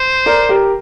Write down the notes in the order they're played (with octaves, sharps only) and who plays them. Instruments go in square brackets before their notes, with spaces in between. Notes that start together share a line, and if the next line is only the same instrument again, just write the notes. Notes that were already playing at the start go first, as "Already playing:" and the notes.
Already playing: [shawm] C5
[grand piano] A#4 D5
G4 A#4